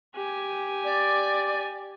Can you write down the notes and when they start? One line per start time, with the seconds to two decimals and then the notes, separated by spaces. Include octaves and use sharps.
0.15 G4 G#5
0.84 D5